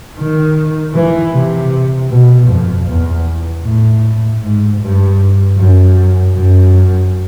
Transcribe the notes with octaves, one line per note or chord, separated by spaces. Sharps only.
D#3
E3
C3
B2
F2
E2
A2
G#2
G2
F#2
F#2